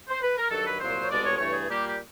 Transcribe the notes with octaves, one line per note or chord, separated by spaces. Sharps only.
C5
B4
A#4
G2 D#3 F#3 A4
B4
C2 A#2 F#3 A#3 C5
C#5
C2 B2 G#3 D5
C#5
G2 E3 A3 C#5
G#4
A#2 G3 A#3 G4
G4